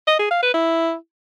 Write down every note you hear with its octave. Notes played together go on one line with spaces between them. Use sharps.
D#5
G#4
F5
B4
E4